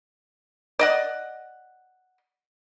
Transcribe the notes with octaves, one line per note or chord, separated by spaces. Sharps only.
D5 D#5 F#5